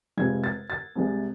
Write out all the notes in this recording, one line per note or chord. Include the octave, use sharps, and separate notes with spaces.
F1 F2 C3 F3 G#3 G#6
A6
A6
C2 C3 G#3